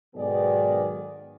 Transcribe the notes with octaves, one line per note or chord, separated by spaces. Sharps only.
B1 G#2 D#3 B3 G#4 D5